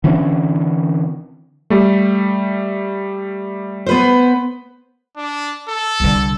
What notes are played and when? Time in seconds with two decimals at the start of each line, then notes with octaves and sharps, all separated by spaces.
0.04 D3 E3 C4 C#4
1.70 G3 A3
3.86 B3 B4 C5
5.17 D4
5.69 A4
6.00 C2 D3